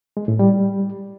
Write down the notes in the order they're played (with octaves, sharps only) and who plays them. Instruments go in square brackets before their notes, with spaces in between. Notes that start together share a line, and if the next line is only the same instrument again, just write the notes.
[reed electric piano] G#3
A2
G3